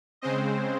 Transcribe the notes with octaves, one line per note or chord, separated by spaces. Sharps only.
C#3 G#3 C4 C5 D#5